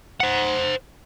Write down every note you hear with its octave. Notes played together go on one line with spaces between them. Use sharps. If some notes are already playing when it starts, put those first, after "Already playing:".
C5 F#5